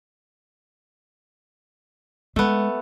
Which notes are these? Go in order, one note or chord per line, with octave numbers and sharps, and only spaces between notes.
G#3 A3 B3